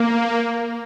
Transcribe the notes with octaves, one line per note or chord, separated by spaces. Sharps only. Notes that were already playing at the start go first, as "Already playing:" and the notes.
Already playing: A#3